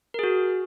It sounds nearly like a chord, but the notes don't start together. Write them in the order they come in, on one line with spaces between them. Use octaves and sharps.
A#4 G#4 F#4